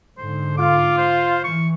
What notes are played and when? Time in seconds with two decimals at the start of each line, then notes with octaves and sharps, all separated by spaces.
0.17 G#2 D3 C5
0.57 F4 D6
0.98 C5
1.44 E3 C#6